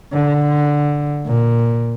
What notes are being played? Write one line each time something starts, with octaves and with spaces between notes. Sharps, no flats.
D3
A#2